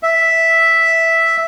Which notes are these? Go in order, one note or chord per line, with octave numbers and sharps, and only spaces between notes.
E5